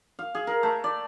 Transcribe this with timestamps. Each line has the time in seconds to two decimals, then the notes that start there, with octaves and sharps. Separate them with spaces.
0.19 F5
0.35 G#4
0.47 A#4
0.63 A3
0.84 D5